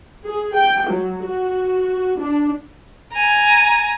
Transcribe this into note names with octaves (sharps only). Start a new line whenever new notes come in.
G#4
G5
F#3
F#4
D4
G#5 A#5